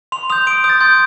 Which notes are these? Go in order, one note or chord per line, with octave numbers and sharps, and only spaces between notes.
C6 F7
D#6 G6 F7
C6 D7
D#6 G6
A6
C6 G6